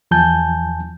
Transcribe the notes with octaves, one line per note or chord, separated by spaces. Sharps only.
E2 F3 G#5 A5 G6